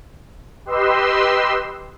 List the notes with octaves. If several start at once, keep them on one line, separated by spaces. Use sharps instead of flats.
G4 B4 D#5 C6 E6